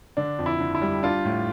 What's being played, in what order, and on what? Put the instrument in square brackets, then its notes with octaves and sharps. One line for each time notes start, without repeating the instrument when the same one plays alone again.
[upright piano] D3 [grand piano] D4
[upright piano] F2
[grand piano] E4
[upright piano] D3
[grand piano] E4
[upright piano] G3
[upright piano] D4 [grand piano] F4
[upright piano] A2